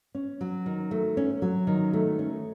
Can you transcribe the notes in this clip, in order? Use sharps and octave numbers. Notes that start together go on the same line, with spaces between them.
C#4
F#3
D#3
A3
C#4
F#3
D#3
A3
C#4